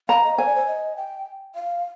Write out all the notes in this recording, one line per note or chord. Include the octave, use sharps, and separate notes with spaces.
F5 A#5
D#5
C5 G#5
D5
C5
D#5
G5
F5